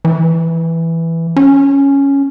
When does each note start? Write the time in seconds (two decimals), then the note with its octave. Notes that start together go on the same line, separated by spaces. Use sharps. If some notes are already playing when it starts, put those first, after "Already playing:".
0.05 E3
1.36 C#4